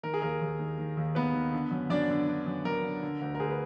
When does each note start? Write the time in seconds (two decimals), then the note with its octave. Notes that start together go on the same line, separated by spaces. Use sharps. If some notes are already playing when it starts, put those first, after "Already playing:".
0.03 D#3 A#4
0.14 G#4
0.22 D#2 A#4
0.41 D#2
0.59 D#3
0.78 D#3
0.97 D#2
1.15 D#2 B3 B4
1.34 D#3
1.53 D3
1.71 F#2
1.90 F#2 D4 D5
2.10 D3
2.28 D3
2.46 F#2
2.65 F#2 A#4
2.84 D3
3.03 D3
3.22 D2
3.35 A#4
3.40 D2 G#4
3.50 B4